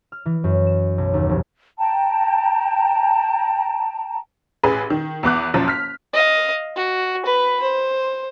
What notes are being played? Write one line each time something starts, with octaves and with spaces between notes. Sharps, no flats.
F6
E3
F#2
E7
B1
D#2
F1
G5 A5 A#5
A1 G#4 B4
D#3
E2 B3 D6 F#6
F#1 F#2 F3
F6 B6
D#5 F5
F#4
B4 B5
C5